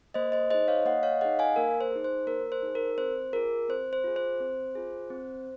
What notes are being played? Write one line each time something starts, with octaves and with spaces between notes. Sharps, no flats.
A#3 C5 D#5
C5 D#5
D#4 G#4 C5 D#5
C#5 F5
A#3 D#5 F#5
C#5 F5
D#4 G#4 D#5 F#5
F5 G#5
A#3 A#4
C5
D#4 G#4
C5
A#3 A#4
C5
D#4 G#4
A#4
C4 C5
F4 G#4 A#4
C4 C5
C5
F4 G#4
C5
C4
F4 G#4
C4